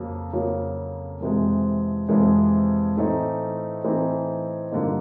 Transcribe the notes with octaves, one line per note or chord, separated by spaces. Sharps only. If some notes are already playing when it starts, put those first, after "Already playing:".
Already playing: F2 C#3 F#3 A#3
F2 C#3 F#3 A#3
F2 C3 E3 G#3
F2 C3 E3 G#3
A2 E3 A3 C4 D#4
A2 E3 A3 C4 D#4
G2 D3 F3 A#3 D#4